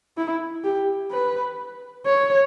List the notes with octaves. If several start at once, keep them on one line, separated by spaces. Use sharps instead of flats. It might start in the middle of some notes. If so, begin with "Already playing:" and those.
E4
G4
B4
C#5